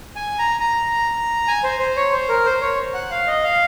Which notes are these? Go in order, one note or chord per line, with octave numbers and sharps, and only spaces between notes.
G#5
A#5
A#5
G#5
C5
C5
C#5
C5
A#4
C5
C#5
F#5
F5
D#5
F5